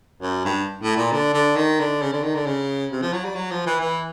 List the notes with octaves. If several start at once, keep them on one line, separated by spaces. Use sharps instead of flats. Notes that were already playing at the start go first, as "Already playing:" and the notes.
F#2
G2
A2
A#2
D3
D3
D#3
D3
C#3
D3
D#3
D3
C#3
C3
F3
F#3
G3
F#3
F3
E3
E3